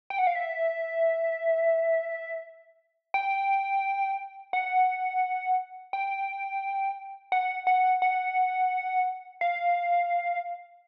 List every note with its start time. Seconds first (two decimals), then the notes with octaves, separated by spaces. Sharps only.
0.10 G5
0.19 F#5
0.27 F5
0.35 E5
3.14 G5
4.53 F#5
5.93 G5
7.32 F#5
7.67 F#5
8.02 F#5
9.41 F5